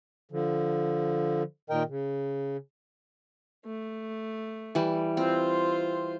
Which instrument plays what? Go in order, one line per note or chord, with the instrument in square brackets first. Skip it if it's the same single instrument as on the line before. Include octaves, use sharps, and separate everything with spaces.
[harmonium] D3 F3
A#2 D#3 A#4 D#5 G5
C#3
[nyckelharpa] A3
[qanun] E3 G3
[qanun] C4 [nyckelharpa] F4 C5